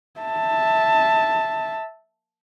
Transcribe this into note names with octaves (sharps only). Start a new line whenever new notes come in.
E5 A5